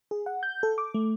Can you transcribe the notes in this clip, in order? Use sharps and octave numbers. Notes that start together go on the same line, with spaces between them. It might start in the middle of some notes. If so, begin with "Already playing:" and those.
G#4
F#5
G6
A4
D6
A3